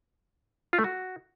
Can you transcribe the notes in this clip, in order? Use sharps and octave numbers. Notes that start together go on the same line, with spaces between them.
F4
A3
F#4